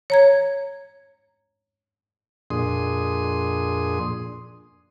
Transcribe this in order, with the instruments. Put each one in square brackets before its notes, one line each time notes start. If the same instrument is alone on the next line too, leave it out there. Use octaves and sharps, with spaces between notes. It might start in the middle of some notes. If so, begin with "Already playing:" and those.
[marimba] C#5 A#5 G#6
[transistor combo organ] F2 A#2 D4 G#4 C6 D#6